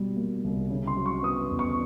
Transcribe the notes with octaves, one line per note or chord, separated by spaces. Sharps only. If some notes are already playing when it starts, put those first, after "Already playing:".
Already playing: B2 G3
A#3
C2
C#3
C6
F#3
C#6
B3 D#6
E2
C#6